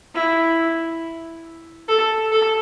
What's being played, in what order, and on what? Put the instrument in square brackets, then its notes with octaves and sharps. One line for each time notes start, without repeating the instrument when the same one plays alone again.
[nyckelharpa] E4
A4
A4